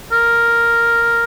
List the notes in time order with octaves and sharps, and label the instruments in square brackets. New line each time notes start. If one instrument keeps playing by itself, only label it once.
[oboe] A#4